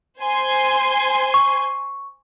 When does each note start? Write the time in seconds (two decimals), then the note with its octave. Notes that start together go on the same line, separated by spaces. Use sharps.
0.19 C5 G#5 C6
1.34 C#6